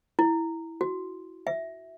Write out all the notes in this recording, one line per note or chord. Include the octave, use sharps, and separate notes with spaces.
E4
F#4
E5